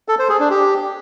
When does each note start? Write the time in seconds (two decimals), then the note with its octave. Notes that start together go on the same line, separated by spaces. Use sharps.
0.08 A4
0.19 C5
0.29 G#4
0.40 D4
0.50 G4